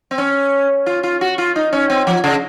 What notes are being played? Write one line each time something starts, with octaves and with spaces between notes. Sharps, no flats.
C4
C#4
F4
F4
F#4
F4
D#4
C#4
C4
F3
C#3